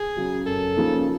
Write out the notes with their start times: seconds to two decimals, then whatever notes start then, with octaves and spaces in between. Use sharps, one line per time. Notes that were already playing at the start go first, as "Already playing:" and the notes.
Already playing: G#4
0.17 C#3 F#3
0.46 F#2 A4
0.76 C#3 F3 A#3 D#4